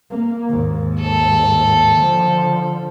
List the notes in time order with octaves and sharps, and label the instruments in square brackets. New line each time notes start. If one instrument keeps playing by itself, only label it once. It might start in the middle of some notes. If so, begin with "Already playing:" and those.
[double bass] A#3
D#2 G#2
[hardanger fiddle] A4
[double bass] D3 F3